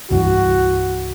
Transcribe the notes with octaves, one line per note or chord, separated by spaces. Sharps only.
C2 G2 E3 F#4